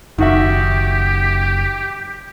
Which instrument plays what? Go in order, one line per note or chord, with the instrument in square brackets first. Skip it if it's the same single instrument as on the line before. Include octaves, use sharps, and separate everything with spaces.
[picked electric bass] F#1 [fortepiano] D#3 F#4 E5 [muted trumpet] G4